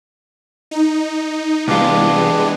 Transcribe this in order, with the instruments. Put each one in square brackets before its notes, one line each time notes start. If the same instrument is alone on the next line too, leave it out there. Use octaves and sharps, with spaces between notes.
[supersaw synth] D#4
[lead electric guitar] C2 F4 [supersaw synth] E3 G#3 B3 [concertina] D4 G4